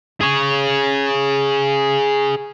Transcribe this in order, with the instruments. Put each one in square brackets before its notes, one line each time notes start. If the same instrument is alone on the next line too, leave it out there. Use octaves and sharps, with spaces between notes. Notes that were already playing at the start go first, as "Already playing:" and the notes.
[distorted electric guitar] G#4 C#5